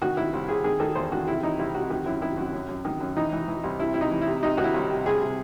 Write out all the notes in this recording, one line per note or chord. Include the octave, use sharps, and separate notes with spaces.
D#3 F#4
D#3 E4
C2
C2 G#4
D#3 G#4
D#3 A4
E2 C5
D#3 F#4
C3 E4
E3 D#4
C2 E4
C3 F#4
D#3 F#4
F#2 E4
D#3 E4
F#2 F#4
F#2
F#2
D#3
F#2
E3 D#4
E3
E3
C2
C3 E4
C3 E4
D#4
E3
E4
C3
C3 D#4
D#3 F#4
E4
C2
C3
C2 G#4
C3